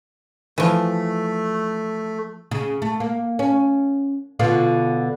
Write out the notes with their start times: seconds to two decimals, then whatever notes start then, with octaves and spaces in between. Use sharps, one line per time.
0.58 E3 F3 A3
2.51 C#3
2.82 A3
3.00 A#3
3.39 C#4
4.39 B2 D3 F4